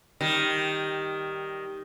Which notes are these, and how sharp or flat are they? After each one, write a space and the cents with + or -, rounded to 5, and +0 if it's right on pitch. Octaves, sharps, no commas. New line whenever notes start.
D#3 +0 G3 +0